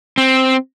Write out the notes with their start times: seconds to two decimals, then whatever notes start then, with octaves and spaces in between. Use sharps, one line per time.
0.18 C4